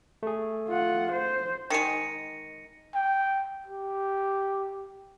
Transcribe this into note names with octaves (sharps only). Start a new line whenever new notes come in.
A3 G#4
F4 F#5
C5
D#3 G#3 A#6 C#7 D#7
G5
G4